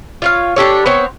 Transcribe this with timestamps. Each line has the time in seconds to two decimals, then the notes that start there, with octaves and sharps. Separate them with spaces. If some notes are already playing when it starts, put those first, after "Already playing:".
0.22 F4 C#5 F5
0.56 D4 G4 A4 C#5
0.86 B3 C4 C#5